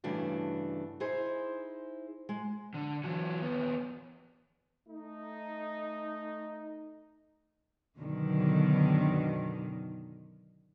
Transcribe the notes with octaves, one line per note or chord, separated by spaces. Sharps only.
G2 C#3 E3 A3 D4 F#4
D#4 E4 G#4 C5
G#3
D3
E3 F#3
D#2 B3
A3 D#4
F#2 B2 D3 D#3 F#3